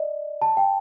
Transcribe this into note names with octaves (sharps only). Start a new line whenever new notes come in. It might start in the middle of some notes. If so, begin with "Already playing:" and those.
Already playing: D5 D#5
A5
G5